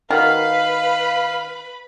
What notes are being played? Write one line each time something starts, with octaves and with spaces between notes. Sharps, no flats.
D#3 F#4 A#4 B4 F5 B5